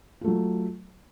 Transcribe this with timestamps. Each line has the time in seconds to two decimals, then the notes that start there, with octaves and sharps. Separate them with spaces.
0.21 F4
0.24 A3
0.27 F#3